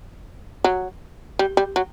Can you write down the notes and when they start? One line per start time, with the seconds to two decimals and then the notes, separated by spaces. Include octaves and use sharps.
0.64 F#3
1.39 G3
1.57 G3
1.76 F#3